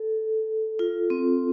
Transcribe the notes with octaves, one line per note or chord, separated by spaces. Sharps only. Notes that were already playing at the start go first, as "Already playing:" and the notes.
Already playing: A4
F4
C4